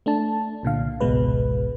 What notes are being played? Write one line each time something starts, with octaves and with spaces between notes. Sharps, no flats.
A3 D4 A5
C2 A#2 D3 F5
G#1 C#2 B2 G#3 B4